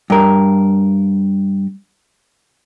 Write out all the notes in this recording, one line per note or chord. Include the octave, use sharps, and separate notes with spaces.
G2 A#4